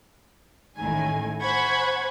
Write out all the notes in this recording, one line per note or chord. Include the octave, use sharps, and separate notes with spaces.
A1 A2 D#3 A3 G#5
C5 F#5 G#5 B5 C#6 G#6